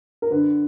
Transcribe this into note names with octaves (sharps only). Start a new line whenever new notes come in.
A#4
D3 B4